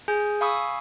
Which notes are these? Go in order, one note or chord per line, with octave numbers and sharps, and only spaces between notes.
G#4 G#5 G6
F5 G#5 B5 C#6 D#6 E6